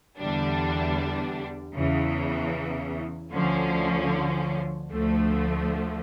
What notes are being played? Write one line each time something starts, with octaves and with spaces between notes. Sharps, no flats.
E2 D3 G3 D4
E2 C#3 E3
D2 D3 F3 C#4
D2 D3 F3 A3